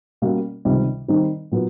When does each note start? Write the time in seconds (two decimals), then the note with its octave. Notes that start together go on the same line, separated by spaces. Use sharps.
0.22 B2 G3 A#3 C#4 F#4
0.65 C#2 C3 D#3 G3 C4
1.08 D#3 G3 C4 D#4
1.52 A#2 F#3 B3